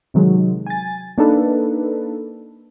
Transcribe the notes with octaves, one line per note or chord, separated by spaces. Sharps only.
C3 D#3 F#3 G#3
G#5 A6
A#3 D4 D#4 A4 B4